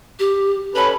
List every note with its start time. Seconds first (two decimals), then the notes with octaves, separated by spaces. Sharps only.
0.19 G4
0.75 C#4 A4 B4 B5